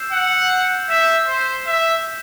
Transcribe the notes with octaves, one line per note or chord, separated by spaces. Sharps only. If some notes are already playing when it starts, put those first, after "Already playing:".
Already playing: E6 G6 C7 E7
F#5
E5 G6 B6 E7
C5
E5